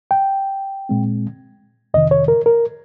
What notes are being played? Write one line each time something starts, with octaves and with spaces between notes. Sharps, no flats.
G5
A#2 G#3 C4
F2 C3 D#3 D#5
C#5
A#4
A#4